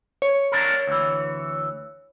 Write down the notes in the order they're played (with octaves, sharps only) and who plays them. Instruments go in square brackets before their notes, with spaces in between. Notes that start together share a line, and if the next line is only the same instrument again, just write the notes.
[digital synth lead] C#5
[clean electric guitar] A#3 D4 A#4
D2 E3